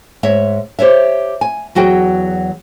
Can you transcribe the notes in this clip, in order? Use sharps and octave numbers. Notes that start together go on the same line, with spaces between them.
G#2 C#5 E5
G4 C5 C#5 E5
G#5
E2 F#3 F#4 G#4 G5